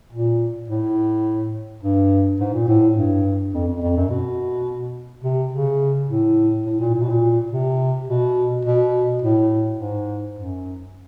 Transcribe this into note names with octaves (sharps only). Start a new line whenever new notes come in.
A#2
A2
G2
G#2
A#2
A2
G2
F2
F2
F2
F#2
B2
C3
C#3
A2
A2
A#2
A#2
B2
A#2
C3
B2
B2
A2
G#2
F#2